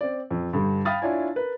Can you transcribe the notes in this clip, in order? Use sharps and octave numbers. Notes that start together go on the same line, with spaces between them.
C4 D5
F2
G2 D3 G3
F5 G5 B5 D#6 F6 A6
D4 E4 F4 C#5 D5 G#5
A#4 B4